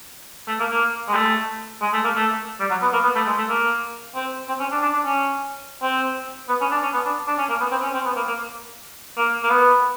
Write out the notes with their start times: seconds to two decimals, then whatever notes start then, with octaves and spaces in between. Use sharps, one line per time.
0.48 A3
0.60 A#3
0.70 A#3
1.08 G#3
1.15 A3
1.82 G#3
1.93 A3
2.04 A#3
2.15 A3
2.60 G3
2.70 F#3
2.82 B3
2.93 A#3
3.04 B3
3.15 A3
3.27 G#3
3.38 A3
3.49 A#3
4.15 C4
4.48 C4
4.60 C#4
4.71 D4
4.82 D4
4.93 D4
5.04 C#4
5.82 C4
6.49 B3
6.61 C#4
6.71 D4
6.82 C#4
6.93 B3
7.06 D4
7.27 D4
7.38 C#4
7.49 A#3
7.60 B3
7.71 C4
7.83 C#4
7.94 C4
8.05 B3
8.16 A#3
8.27 A#3
9.17 A#3
9.44 A#3
9.50 B3